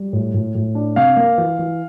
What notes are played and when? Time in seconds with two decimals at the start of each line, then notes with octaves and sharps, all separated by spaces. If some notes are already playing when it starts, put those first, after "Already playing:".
Already playing: G3
0.13 A2
0.34 A2
0.55 A2
0.75 D4
0.96 C3 F5
1.16 A#3
1.38 E3
1.59 E3